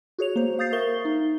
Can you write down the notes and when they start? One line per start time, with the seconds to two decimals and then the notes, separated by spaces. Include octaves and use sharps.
0.19 F#4 G#4 C#5 F7
0.36 A#3 C5
0.59 F5 D#6 G6 A6 C7
0.72 A#4 E5 C#6 G7
1.05 D#4